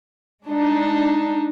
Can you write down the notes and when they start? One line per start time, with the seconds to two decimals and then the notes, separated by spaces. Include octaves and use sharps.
0.47 G#3 D4 D#4